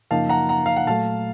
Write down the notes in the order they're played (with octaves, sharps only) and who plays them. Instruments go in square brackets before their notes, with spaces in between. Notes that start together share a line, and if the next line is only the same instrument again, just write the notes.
[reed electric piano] F#2 C#3 F3 A#3 D#4 [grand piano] F5 A5
[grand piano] F#5 A#5
F#5 A#5
F5
F#5
[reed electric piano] A#2 F#3 A3 [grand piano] F5 A5